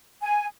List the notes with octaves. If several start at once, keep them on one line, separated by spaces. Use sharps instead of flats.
G#5